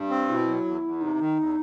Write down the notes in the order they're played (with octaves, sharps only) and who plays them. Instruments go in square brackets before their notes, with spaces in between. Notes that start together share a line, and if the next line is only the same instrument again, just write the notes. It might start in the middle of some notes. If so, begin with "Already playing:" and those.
Already playing: [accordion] G2
C4
[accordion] B2 [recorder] E4
[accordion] F#3
E2
E2
[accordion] C3 [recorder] D#4
[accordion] D#3
E2